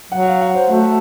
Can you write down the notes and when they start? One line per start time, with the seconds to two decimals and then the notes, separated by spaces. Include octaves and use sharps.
0.12 F#3 F#5
0.26 F5
0.41 F#5
0.55 C5
0.69 A3 F#4